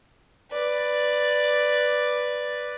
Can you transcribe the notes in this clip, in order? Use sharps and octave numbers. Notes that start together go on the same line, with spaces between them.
B4 D5